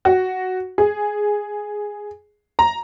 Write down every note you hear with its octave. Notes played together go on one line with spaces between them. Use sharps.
F#4
G#4
A#5